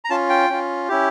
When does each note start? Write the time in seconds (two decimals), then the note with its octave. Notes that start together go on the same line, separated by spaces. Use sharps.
0.05 A#5
0.10 C#4 F4 A5
0.29 G5
0.50 C#4 F4
0.88 C#4 E4 G4